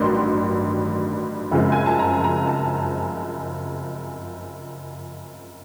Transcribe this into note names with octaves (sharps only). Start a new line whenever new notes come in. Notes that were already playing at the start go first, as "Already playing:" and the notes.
Already playing: A1 G2 D#3 F#3 C6
F#2 C#3 F3 G#3 C4
G#5
A5
A#5
A#5
A5